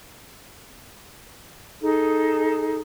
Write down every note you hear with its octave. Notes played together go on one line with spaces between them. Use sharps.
D#4 G#4 A4